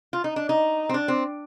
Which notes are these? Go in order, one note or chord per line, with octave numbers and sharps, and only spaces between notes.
F4
D#4
D4
D#4
C4
D4
C4